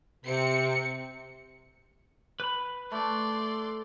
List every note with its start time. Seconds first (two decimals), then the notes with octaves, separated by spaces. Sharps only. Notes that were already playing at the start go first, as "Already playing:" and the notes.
0.25 C3 C4 C#7
2.40 B4 B5
2.92 A3 D5 C6